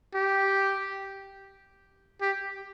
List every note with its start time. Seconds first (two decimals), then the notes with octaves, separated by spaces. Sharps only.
0.15 G4
2.21 G4